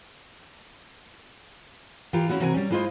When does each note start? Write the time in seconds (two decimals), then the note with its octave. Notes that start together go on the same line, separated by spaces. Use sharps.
2.13 E3 F4 G4 A#4
2.29 C#4 D#4 E4 F#4 G#4
2.40 C3 E3 F#4 A#4 E5 G#5
2.54 G3 C#4
2.71 G#3 E4 F4 C5 D#5